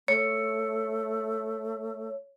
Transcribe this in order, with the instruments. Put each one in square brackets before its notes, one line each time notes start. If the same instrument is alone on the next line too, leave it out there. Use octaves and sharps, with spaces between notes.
[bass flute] A3 [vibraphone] C#5